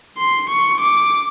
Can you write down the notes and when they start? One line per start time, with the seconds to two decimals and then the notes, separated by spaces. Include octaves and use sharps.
0.18 C6
0.49 C#6
0.80 D6